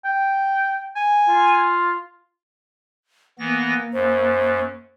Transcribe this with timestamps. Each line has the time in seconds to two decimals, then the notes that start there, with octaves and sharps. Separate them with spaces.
0.05 G5
0.96 G#5
1.28 F4
3.39 E3 A#3 B3 A#6
3.93 F#2 C5